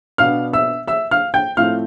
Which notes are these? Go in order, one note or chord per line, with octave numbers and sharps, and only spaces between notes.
B2 B3 D4 F5 F6
E5 E6
E5 E6
F5 F6
G5 G6
A2 F3 A3 C4 F5 F6